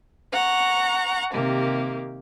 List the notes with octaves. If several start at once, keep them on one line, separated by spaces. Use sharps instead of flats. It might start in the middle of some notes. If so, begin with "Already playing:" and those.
F#5 A#5 C#6
C3 D#3 A#3 G4